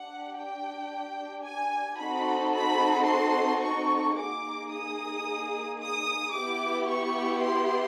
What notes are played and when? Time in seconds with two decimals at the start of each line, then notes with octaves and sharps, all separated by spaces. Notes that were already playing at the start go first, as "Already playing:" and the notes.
Already playing: D4 G4 F#5
0.36 G5
1.44 G#5
1.98 C4 D#4 F#4 A4 B5
2.53 B5
3.07 C6
3.61 C#6
4.16 A#3 D#4 G#4 D6
4.71 D#6
5.80 D#6
6.33 B3 E4 G4 D6
6.88 C#6
7.42 C6